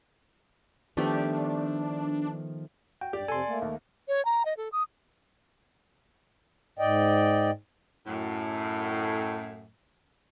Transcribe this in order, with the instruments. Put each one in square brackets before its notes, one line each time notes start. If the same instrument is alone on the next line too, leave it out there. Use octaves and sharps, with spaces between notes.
[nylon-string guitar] D#3 F3 B3 [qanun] A3 G4 [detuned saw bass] D4
[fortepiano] F#4 [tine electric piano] G5
[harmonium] G2 [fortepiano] G4 [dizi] D5
[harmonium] F2 C3 [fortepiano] A4 [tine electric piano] G#5 C6
[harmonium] A3 A#3
[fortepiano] D#2
[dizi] C#5
A#5
D#5
A4
D#6
[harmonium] G#2 D5 D#5 G5
[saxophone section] F#2 A2